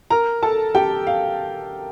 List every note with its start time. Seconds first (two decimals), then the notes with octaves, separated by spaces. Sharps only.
0.10 A#4 A#5
0.43 A4 A5
0.75 G4 G5
1.07 F5